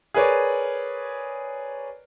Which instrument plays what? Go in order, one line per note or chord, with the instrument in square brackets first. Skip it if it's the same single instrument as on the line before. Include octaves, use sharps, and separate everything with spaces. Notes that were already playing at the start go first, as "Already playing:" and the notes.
[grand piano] G#4 A#4 B4 C#5 D5